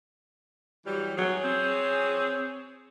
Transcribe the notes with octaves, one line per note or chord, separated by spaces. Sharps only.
E3 F#3 G3
F#3 G#4 C#5
C4